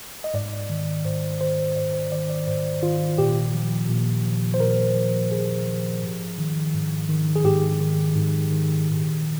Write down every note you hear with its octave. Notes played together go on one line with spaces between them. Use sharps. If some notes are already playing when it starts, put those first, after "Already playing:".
D#5
G#2 D5
D#3
G#2 C5
D#3 C5
G#2 D5
C5
D#3 D5
D5
G#2 C5
D#3 F4
A#2 G4
F3
A#2
F3
C5
A#2 A#4
F3
A#2 G#4
F3
G#2
D#3
G#2
D#3
G#4
G#2 G4
D#3
G#2
D#3
A#2
F3